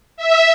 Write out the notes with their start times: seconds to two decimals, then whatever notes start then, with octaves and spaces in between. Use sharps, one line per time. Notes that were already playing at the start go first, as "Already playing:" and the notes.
0.17 E5